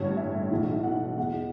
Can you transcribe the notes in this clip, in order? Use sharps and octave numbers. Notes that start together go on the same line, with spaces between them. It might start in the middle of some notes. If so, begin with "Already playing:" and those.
Already playing: A1 G2 D3 C#5
E5
B1 A2 E3
F#5
E2 B2 F#5